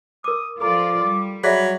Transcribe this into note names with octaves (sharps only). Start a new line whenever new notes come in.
A#4 D6 D#6
F3 F4 A4 D5 A#5 D6
G3
F#3 G#4 D5 E5 B5